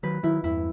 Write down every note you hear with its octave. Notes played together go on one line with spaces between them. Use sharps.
D#3 F#3 B4
D#3 F#3 E4
E2 G2 E4